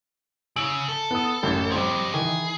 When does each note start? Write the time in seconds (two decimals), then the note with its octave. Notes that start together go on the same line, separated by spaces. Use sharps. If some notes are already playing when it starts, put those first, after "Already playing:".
0.56 C#3 E6 D7 F#7
0.89 A4
1.11 B3 D#6
1.43 A1 F#2
1.72 F3 G3 C4 D#5
2.14 D#3 E3 G#4